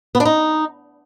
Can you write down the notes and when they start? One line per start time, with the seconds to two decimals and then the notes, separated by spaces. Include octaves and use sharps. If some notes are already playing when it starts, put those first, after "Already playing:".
0.15 B3
0.20 D4
0.25 D#4